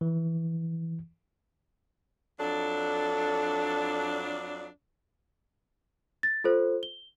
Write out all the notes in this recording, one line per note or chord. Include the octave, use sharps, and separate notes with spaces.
E3
F2 F#3 D4 A4
A6
F4 A4 C5
G7